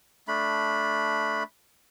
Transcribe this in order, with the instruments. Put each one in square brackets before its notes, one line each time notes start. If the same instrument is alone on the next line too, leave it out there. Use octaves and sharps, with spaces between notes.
[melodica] A3 D4 B5